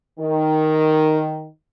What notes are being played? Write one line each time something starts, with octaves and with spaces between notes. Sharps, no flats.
D#3